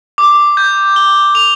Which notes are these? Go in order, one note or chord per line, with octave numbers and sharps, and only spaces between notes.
D6
G6
G7
F7